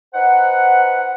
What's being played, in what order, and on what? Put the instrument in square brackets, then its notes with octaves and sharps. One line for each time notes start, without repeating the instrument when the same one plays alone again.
[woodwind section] D#4 B4 C5 F#5